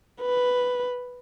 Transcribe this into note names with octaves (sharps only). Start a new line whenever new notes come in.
B4